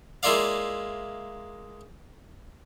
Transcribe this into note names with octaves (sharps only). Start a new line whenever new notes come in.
G#3 A#3 E4 F4 D5 F5